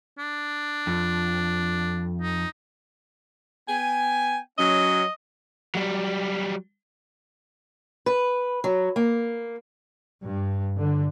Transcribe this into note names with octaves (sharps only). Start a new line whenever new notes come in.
D4
F2
D#4
B3 G5 G#5
F#3 C#4 D#5
F#3 G3
B4
F#3
A#3
G2
D3